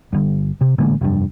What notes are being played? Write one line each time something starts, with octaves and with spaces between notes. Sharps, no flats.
G1 G2
C3
A1 D3 G#3 A#3
F1 G2